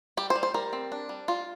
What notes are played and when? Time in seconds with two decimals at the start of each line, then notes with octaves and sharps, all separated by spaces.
0.17 G3 G4
0.30 C5
0.36 G3
0.43 C5
0.54 G3 A#4
0.73 C4
0.92 D4
1.09 G3
1.28 G3 F4